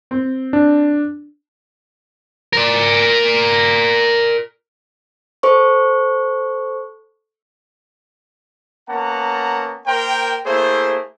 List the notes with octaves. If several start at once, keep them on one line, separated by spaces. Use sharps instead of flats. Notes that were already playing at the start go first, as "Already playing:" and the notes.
C4
D4
A#4 D5
A4 C5 C#6
A#3 B3 C#4 F#5 A5 A#5
A#3 A#4 C5 G5
A3 A#3 E4 G#4 C5